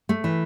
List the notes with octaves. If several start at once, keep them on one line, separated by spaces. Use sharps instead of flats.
A3
E3